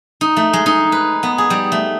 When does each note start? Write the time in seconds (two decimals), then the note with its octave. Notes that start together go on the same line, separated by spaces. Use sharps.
0.21 D#4
0.37 A3
0.53 G#3
0.66 D#4
0.92 B4
1.23 B3
1.38 G#4
1.50 G3
1.72 A3